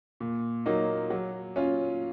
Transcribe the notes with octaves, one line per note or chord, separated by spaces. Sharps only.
A#2
F#3 A#3 D#4
F#3
C#4 F4